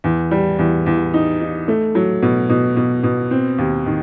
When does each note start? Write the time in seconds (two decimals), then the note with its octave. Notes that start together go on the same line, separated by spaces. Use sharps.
0.04 E2
0.31 G3
0.59 E2
0.86 E2
1.14 D#4
1.41 D#4
1.68 A3
1.95 F#3
2.22 B2
2.49 B2
2.76 B2
3.03 B2
3.31 C4
3.58 D#2
3.86 D#3